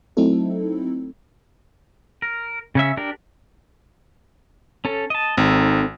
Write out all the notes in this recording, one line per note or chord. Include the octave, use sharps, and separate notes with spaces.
F#3 A3 C4 D#4 E4 A4
A#4
C#3 C#4 E5
D4 G4 A#4
C#4 A4
D#5 A5
G#1 C4 D#4 A4